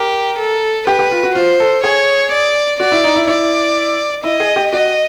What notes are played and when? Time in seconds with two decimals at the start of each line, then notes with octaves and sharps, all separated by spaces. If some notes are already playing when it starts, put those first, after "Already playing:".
Already playing: G4 A#4
0.39 A4
0.87 G4 B4
0.99 G4
1.11 F4
1.23 F#4
1.35 F4 C5
1.60 A4
1.83 G#4 C#5
2.32 D5
2.80 F#4 D5
2.92 E4
3.04 D#4
3.16 E4
3.27 E4 D5
4.24 E4 D#5
4.40 G#4
4.56 G4
4.72 F#4 D#5